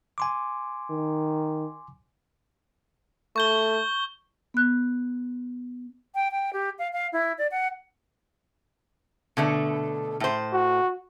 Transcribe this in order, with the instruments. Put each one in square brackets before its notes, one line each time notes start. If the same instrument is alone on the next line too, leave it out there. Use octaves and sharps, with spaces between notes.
[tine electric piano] G#5 C6 D6
[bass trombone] D#3
[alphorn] A3 [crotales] C#6 G6 G7
[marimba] B3 F#6
[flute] G5
G5
G4
F5
F5
E4
D5
F#5
[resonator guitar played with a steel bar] B2 D3 A3
A2 C5
[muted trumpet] F#4